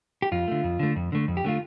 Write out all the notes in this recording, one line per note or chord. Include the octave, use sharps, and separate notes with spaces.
G4
F2 F4
D3 A3
F2
D3 A3
F2
D3 A3
F2
G4
D3 A3 F4